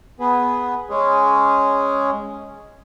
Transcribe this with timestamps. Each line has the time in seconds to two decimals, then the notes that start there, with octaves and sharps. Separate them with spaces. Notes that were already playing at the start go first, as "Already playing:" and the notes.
0.20 B3 G#4 B4
0.90 G#3 C#4 G#4